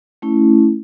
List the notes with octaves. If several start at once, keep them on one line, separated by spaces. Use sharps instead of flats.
A3 C#4 E4